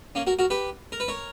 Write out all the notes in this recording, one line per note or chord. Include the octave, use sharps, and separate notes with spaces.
A#3 C#4
F#4 A#4
F#4 A#4
G4 B4
A#4
B4
A#4 C#5